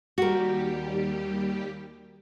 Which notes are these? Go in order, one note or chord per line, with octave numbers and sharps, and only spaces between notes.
D#2 G3 F#4 G4 A#4